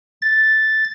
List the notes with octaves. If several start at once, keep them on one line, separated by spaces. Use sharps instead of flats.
A6